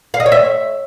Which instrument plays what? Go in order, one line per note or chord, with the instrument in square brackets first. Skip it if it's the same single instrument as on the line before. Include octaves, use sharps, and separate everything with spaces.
[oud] F5
D#5
C#5
E5